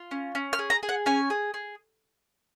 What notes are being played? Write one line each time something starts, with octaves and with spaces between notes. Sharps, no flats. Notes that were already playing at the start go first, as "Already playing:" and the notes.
Already playing: F4
C#4
C#4
F6
G#4
A#5
G#4
F#5
C#4 G#5
G#4
G#4